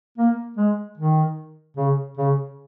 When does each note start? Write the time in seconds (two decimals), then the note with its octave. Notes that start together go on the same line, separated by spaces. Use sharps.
0.18 A#3
0.57 G#3
0.98 D#3
1.77 C#3
2.17 C#3